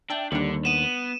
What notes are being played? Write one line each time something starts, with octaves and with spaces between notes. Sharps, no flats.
D4 E5 G5 A5
D#2 D3 G3 D4
B3 D#7 E7